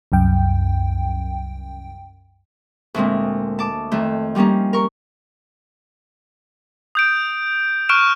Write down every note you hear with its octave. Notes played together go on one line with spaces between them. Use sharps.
C2 F#2 G5
D2 A#2 G#3 C4
A5 D6
F2 D#3 A3
F3 G3 A#3 C#4 D#4
A#4 C#6
D#6 G6 D7
C#6 F6 F#6 D7 E7